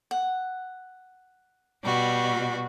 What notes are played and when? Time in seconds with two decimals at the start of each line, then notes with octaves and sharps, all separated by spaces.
0.11 F#5
1.84 B2 G3 F#4